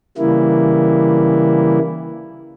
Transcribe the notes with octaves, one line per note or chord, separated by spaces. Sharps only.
C#3 E3 G3 A#3 E4